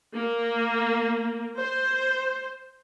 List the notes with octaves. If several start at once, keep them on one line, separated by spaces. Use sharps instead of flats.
A#3
C5